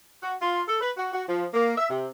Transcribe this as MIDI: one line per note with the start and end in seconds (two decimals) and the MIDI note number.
0.22 0.34 66
0.42 0.61 65
0.68 0.78 69
0.81 0.92 71
0.97 1.08 66
1.12 1.23 66
1.27 1.45 53
1.54 1.74 58
1.78 1.88 76
1.89 2.08 48